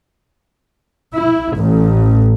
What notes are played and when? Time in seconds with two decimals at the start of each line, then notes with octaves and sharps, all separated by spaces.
1.15 E4
1.56 A1